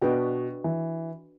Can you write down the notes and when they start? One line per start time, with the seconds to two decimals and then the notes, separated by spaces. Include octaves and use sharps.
0.02 B2 D4 F#4 B4 D#5 G5
0.64 E3